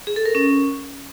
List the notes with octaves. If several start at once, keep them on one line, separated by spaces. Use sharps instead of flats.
G#4
A4
A#4
C#4